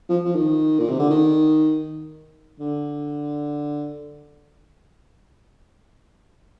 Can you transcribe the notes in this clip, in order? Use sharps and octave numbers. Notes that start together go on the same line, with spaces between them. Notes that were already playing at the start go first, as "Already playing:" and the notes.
F3
F3
D#3
A#2
C3
D3
D#3
D3